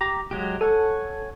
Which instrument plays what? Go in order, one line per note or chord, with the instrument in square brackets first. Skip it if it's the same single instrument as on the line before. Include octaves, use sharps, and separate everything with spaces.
[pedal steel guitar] G4 A#5
F#3 G#3 G4
[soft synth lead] A4 [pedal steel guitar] C#5 F#5 G#5